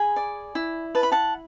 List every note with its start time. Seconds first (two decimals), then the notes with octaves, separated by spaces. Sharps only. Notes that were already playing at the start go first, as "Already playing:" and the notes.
Already playing: G#4 G#5 B5
0.16 D5
0.55 E4
0.95 B4 A5
1.03 B5
1.12 F#5 A5